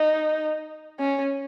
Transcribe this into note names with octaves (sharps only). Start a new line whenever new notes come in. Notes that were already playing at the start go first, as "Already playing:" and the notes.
Already playing: D#4
C#4